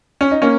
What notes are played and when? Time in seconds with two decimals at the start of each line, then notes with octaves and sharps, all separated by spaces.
0.21 C#4
0.31 D#4
0.42 A#3 C#4